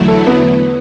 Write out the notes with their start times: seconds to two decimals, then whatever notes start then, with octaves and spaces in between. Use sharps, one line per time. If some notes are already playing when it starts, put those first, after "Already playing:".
Already playing: E2 D3 F#3 A3 E4
0.08 A4
0.27 B3